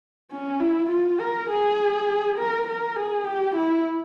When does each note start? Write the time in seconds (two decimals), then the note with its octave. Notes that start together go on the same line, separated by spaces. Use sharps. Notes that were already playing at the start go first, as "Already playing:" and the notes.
0.31 C#4
0.60 E4
0.90 F4
1.20 A#4
1.50 G#4
2.38 A#4
2.68 A#4
2.96 G#4
3.26 G4
3.56 E4